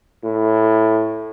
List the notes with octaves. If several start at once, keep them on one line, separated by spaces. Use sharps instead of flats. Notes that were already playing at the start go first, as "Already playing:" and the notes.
A2